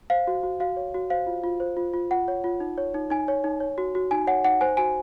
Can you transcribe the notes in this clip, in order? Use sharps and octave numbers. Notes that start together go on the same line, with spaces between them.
C5 F5
F#4
F#4
F#4 F5
C#5
F#4
C5 F5
F4
F4
C5
F4
F4
F4 F#5
C#5
F4
D#4
C#5
D#4
D#4 G#5
C#5
D#4
C#5
F#4
F#4
D#4 G#5
C#5 F#5
D#4 F#5
C5 G#5
F#4 G#5